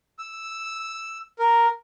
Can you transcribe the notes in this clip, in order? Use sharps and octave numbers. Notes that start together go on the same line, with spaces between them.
E6
A#4